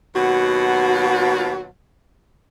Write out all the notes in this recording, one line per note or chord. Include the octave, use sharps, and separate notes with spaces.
D#2 B2 F#3 F#4